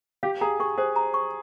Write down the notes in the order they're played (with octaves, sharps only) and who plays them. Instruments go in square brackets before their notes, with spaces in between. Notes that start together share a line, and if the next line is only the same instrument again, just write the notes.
[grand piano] G4 [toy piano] F5
[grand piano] G#4 [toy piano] A#5
[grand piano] G#4 [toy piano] C#6
[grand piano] G#4 [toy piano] C5
[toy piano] A#5
C#6